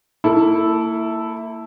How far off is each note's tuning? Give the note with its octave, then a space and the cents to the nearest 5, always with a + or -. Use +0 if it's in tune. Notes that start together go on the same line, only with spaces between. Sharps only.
A#3 -35 E4 +0 A4 -5